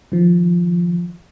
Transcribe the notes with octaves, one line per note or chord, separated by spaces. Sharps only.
D#3 F3